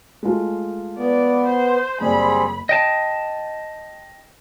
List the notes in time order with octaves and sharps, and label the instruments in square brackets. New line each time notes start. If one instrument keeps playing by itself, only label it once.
[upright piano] G#3 A3 F4
[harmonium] B3 [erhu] D5
[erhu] C5
[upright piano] F#1 [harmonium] G3 C4 G#4 [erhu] B5
[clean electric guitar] D#5 G5 A5